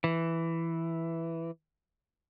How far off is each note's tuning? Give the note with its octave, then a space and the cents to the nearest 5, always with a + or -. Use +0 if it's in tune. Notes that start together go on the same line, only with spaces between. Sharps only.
E3 +5